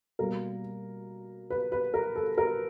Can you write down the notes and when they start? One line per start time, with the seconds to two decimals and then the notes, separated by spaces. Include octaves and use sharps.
0.19 B2 G3 A#3 A#4
1.50 B4
1.72 B4
1.94 A#4
2.16 A4
2.38 A#4